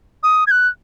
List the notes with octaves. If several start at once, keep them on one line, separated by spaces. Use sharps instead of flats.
D#6
G#6
F#6